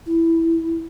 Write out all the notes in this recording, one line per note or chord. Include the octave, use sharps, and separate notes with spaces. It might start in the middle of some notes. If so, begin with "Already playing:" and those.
E4